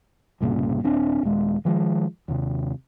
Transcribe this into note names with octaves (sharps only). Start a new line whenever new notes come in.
C2 G2 A#2 C#3
D#1 C4 D4
D#1 G#3
D#3 F3 G#3
D#2 C3